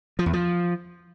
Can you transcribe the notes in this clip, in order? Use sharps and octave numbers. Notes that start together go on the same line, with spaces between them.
F3
E2
F3